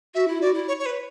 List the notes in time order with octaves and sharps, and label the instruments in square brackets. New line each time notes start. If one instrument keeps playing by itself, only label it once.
[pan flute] F#4 [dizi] E5
[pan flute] E4
[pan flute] F#4 [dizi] D5
[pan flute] E4
[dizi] C#5
C#5
B4